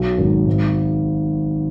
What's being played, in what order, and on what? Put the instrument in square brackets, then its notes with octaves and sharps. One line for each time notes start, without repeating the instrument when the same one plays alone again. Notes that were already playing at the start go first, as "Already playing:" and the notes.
Already playing: [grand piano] B1 F#3
G#1
G#2